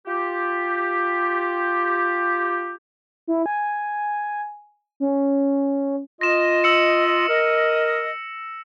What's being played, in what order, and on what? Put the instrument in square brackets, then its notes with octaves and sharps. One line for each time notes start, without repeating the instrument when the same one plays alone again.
[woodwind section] F4 G4
[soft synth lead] E4
G#5
C#4
[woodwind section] F4 D#5 [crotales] A#6 E7
[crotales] E6 C#7
[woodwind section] A#4 D#5